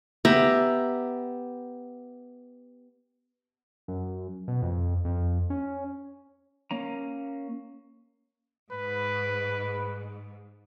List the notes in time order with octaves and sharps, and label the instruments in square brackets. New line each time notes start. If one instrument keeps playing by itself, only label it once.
[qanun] B3 G4 E5 A#5
[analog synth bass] F#2
B2
F2
F2
C#4
[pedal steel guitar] A#3 C#4 A#5
[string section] G#2 [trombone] B4